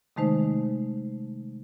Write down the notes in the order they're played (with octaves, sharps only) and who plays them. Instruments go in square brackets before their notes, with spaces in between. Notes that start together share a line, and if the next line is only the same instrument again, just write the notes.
[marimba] C3 D#3 G#3 A3 D#4 C5